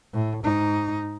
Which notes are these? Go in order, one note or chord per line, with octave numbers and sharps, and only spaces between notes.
A2
G#2 D#4